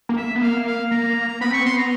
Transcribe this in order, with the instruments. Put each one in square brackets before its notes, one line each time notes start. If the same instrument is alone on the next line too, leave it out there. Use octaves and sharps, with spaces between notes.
[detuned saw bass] A#3
[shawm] E5
[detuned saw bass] B3
[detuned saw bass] A#3 [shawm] F5
[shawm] F5
[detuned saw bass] A#3 [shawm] A#5
[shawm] A#5
[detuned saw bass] B3 [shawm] B5
[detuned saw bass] C4 [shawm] C#6
[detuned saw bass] B3
[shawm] C6
A#5